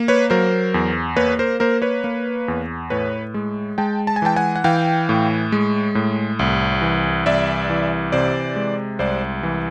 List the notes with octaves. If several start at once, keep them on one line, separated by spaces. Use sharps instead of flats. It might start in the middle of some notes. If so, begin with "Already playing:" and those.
Already playing: A#3
B4 C#5
F#3 A#4 C5
E2
A#3 B4 C#5
A#4 C5
A#3 A#4 C5
B4 C#5
A#3
E2
A2 B4 C#5
G#3
G#3 G5 A5
A5
G#5
E3 G5 A5
F#5 G#5
F#5
E3 F5 G5
A2
G#3
A2
C2
E3
C2 D5 E5
E3
C3 C5 D5
G#3
C2 C5 D5
E3